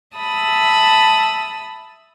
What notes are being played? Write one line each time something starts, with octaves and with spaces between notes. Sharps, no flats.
E5 A5 B5 D#6 E6